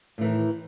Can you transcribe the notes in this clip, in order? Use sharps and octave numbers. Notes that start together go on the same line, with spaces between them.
A2 D#3 E3